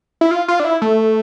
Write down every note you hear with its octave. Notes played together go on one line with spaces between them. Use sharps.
E4
F4
F4
D4
E4
A3